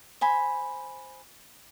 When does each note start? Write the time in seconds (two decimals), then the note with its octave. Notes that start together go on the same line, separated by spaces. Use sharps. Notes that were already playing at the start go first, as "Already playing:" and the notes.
0.21 C5 G#5 B5